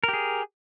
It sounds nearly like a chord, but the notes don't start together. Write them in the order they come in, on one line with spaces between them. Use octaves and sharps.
A#4 G4 G#4